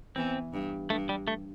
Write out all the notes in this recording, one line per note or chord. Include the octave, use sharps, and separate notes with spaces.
E2 E3 C4
G2
G2 A3
G3
A3